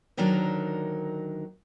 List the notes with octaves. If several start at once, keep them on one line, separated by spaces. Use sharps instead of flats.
D2 D#3 F#3 D4 D#4 A#4